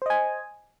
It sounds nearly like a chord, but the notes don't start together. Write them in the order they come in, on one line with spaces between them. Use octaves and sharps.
C5 D#5 G#5